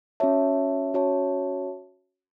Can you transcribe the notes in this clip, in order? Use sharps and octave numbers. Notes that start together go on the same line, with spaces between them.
C#4 F#4 C#5 E5 A5
C#4 F#4 C#5 E5 A5